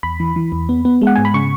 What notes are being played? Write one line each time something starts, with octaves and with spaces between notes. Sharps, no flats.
E2 B5
E3
E3
E2
B3
B3
G#3
F#5
G#2 G#5
B5
C#3 C#6